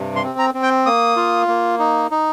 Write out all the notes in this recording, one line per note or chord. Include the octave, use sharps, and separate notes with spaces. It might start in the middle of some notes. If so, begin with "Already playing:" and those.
Already playing: G2 C3
C6
C4
A#5
C4
G5
A#3 D#6
F4
A#3
D#4
D#4